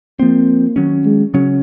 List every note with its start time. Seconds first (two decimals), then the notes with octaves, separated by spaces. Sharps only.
0.19 F3 A#3 C4
0.76 D#3 F#3 C#4
1.05 G#3
1.34 C#3 F#3 C#4